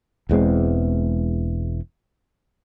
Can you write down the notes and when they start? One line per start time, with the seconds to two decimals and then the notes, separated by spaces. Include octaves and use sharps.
0.29 E1 E2 G#3 C4